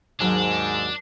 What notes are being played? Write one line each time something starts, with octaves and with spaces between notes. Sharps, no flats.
D#2 G#2 F#3 D4 G#5